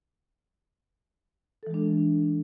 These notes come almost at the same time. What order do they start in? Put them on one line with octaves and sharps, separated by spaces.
A4 E3 G#3 D4